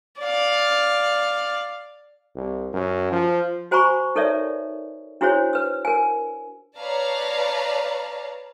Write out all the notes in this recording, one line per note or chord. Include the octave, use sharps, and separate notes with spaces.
D5 F5
C2
F#2
F3
F#4 C5 G#5 A#5 B5 C#6
D#4 A4 A#4 C#5 D5 E5
D4 E4 F#4 G#4 C5 C#5
B4 E6
A#4 G#5
B4 C#5 D5 F5 A5 A#5